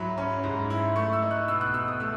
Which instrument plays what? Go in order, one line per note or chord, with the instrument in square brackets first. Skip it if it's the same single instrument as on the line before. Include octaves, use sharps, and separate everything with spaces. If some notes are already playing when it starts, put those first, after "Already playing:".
Already playing: [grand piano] G#2 F#3 E4 B5
C#4
G#2
E4
A3 C#6
E6
D#4
F#6
B2 E6
F#6
B2 E6
D#6
A3 E6